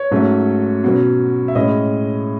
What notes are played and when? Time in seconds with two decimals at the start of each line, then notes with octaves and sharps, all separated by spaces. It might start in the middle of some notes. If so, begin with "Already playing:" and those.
Already playing: C#5
0.11 G#2 F#3 A3 C#4
0.84 B2 F#3 C#4
1.48 E5
1.55 A2 G#3 C#4 D#5